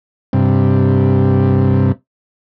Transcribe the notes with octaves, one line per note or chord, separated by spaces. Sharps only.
G2 C3